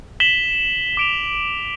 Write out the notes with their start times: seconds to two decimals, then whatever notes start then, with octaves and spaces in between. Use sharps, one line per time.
0.20 B6 E7 F#7 G7
0.97 D6 D7 F7